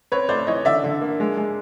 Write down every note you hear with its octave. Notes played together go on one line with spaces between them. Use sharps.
C4 B4 C#5
A3 C5 D5
E3 C#5 D#5
D3 D5 E5
D3
A#3
G#3
G#3